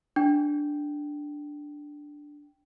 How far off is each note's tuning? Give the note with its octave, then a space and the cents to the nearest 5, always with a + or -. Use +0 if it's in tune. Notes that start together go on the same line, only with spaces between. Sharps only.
D4 +0 G5 -5